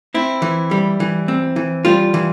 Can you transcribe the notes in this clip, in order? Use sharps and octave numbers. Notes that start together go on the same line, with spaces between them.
C4 E4
E3
G3
E3
C4
E3
G3 F4
E3